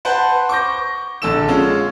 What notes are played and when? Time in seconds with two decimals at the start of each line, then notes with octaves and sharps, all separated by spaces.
0.05 B4 C5 F#5 A5
0.49 C#6 D6 G6 A#6
1.22 A#1 D3 A4 E6 E7
1.48 G#3 C#4 F4